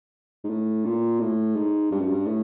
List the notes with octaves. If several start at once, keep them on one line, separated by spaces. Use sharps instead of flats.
G#2
A2
A#2
A2
G#2
G2
F#2
G2
A2